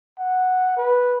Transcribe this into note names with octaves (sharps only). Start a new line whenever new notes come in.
F#5
B4